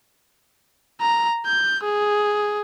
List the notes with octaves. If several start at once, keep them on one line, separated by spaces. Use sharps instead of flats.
A#5
G6
G#4